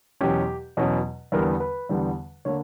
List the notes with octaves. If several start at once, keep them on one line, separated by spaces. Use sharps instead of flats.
E2 B2 F#3 C#4 G4
E2 B2 F#3 C#4
E2 D3 G3 B3 A#4
B4
E2 D3 G3 B3
D3 A#3 C#5